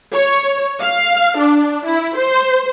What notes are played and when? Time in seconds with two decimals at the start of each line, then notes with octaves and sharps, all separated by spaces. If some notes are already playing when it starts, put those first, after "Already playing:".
0.14 C#5
0.81 F5
1.37 D4
1.86 E4
2.17 C5